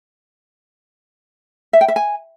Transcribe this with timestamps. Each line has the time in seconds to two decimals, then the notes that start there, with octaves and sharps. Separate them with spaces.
1.73 E5
1.81 G5
1.88 E5
1.96 G#5